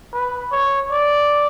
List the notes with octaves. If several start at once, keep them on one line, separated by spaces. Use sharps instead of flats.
B4
C#5
D5